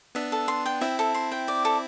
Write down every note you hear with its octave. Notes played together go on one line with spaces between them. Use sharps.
B3 D4 E5
A4
C6
G5
C4 E4 E5
A4
C6
G5
D5
A4